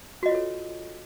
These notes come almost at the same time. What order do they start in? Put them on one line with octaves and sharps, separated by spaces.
F#4 D#5 F4 C#5 A4